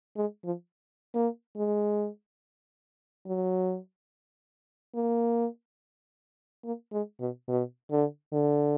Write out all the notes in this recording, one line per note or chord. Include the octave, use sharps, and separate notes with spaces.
G#3
F3
A#3
G#3
F#3
A#3
A#3
G#3
B2
B2
D3
D3